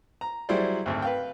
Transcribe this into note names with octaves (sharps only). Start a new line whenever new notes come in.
A#5
F#3 G3 E4 G#4 C5 D5
G#1 D2
B4 F5 G5